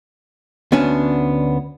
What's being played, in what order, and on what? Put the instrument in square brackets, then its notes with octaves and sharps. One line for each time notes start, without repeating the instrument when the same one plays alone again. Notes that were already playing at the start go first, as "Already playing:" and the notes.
[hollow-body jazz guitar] D2 B3 C#4 D4